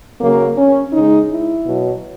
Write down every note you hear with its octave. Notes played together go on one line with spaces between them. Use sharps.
C#3 F#3 A#3
C#4
C#3 G#3 D#4
E4
B2 F#3